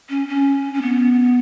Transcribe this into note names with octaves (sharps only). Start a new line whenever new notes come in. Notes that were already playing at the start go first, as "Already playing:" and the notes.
C#4
C#4
C#4
B3